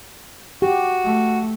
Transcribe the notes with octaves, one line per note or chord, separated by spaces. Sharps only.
F#4 G4
A3